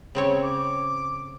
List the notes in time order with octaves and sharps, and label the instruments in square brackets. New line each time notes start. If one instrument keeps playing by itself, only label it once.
[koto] C#3 C4 C#5
[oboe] D6